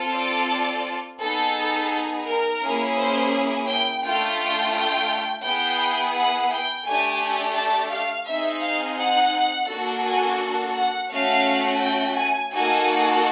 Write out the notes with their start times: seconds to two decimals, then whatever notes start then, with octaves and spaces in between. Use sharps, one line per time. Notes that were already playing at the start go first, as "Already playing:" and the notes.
Already playing: C4 F4 A4
0.14 D5
1.20 B3 D#4 G#4 A4
2.26 A#4
2.62 A#3 C#4 E4 G#4
2.97 C5
3.68 G5
4.03 A3 D4 F4 G5
4.39 G5
4.74 G5
5.45 B3 E4 G#4 G5
6.15 F#5
6.51 G5
6.86 A3 D4 G4 G#5
7.57 A5
7.92 F5
8.27 C4 D#4 G#4 E5
8.63 F5
8.98 F#5
9.69 A#3 D4 F#4 A4
10.04 G#5
10.75 F#5
11.10 A3 C#4 F#4 F5
11.81 G5
12.16 G#5
12.52 A#3 D#4 F#4 A4 G#5